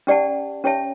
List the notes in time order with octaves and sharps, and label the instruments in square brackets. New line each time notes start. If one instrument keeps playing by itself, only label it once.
[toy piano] C#4 G4 D5 F#5 A5
C#4 G4 C#5 E5 A5